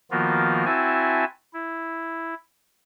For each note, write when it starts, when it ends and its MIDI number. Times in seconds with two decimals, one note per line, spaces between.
0.11 0.65 51
0.11 0.65 53
0.11 0.65 58
0.11 0.65 59
0.11 0.65 65
0.11 0.65 66
0.65 1.24 60
0.65 1.24 64
0.65 1.24 66
0.65 1.24 76
0.65 1.24 80
0.65 1.24 81
1.53 2.34 64